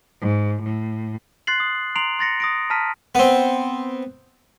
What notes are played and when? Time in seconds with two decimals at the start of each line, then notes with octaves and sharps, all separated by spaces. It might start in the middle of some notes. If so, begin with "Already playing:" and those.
0.20 G#2
0.61 A2
1.47 C6 F#6 A6 C7 F#7
1.60 D#6
1.95 A#5 C6 C7 D7 F7 F#7
2.19 C6 A6 A#6 C#7
2.40 D#6 A#6 D7
2.70 A5 A#5 F6 B6 D#7
3.15 B3 C4